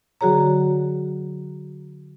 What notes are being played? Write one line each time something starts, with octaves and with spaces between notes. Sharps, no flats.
D3 F#3 F#4 G#4 C#5 A#5